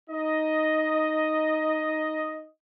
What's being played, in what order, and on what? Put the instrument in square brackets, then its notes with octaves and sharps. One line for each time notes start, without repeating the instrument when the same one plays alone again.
[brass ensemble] D#4 D#5